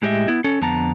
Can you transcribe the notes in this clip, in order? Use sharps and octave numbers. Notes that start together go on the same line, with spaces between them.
A2 G#3 G4 B4 D#5 E5
B3 E4
C#4 A4
F2 D3 B3 A5 A#5